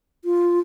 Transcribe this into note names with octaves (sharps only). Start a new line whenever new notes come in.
F4